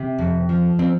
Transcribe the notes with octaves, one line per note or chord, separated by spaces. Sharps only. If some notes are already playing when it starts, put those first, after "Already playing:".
Already playing: C3
F2
F3
C4